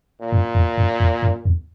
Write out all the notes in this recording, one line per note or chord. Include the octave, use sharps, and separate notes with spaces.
A#2
F#2
E2
F#2
E2
F#2
E2